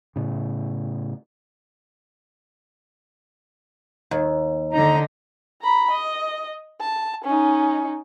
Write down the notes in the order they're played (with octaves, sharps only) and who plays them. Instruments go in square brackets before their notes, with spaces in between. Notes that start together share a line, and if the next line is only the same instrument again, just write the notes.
[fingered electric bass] A2 C#3
[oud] D#2
[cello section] D3 D#4 [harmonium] A#5
[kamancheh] A#5 B5
D#5
A5
C#4 D#4